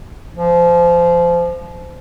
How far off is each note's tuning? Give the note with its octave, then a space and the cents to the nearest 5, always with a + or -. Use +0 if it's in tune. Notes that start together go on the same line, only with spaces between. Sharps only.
F3 -25